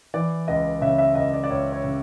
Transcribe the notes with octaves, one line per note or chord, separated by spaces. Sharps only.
E3 D5
C#2 D#5
C#3 E5
E5
C#2 D#5
D5
D5
C#2 C#5
C#5
C#3